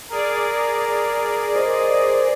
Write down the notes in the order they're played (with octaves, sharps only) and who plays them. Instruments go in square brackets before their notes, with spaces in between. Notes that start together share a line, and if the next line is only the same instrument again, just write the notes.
[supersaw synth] G#4 D5 [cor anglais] A#4
[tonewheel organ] A#4 C5 [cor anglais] D#5